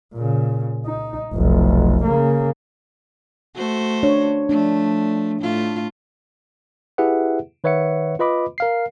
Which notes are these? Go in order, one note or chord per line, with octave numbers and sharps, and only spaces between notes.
A#2 C#3
D#4
F1 B1
C#3 A#3
A3 F#4 C5
D4 C#5
F3 A3 D4
A2 A3 F4
E4 G4 G#4 B4 E5 F#5
D#3 B4 C#5 E5 F#5 C#7
F4 B4 D#5 B5 D6
A#4 F5 C7